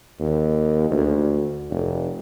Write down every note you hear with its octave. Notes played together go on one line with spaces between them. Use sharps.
D#2
D2
F1